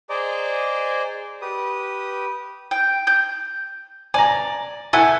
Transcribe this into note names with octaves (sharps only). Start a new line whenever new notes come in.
G#4 C5 D5 D#5 A#5 D6
G4 B4 D#6
G5
G6
D5 G#5 A#5
A3 E4 A4 F#5 G#5